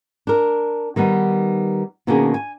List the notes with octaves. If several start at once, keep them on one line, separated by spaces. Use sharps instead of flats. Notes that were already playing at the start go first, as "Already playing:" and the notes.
D4 A#4
D#3 G3 B3 D#4
B2 D#3 A#3 C#4 D4 G#4
G#5